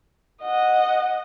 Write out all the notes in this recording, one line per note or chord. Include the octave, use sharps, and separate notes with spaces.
D#5 F#5